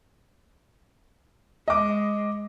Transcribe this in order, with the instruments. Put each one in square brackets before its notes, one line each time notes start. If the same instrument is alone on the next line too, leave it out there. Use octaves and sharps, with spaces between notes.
[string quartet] G#3 [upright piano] D#5 D6